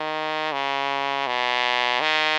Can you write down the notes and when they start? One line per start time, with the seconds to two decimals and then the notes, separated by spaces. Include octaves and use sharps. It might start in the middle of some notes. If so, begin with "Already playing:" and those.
Already playing: D#3
0.52 C#3
1.27 B2
2.01 D#3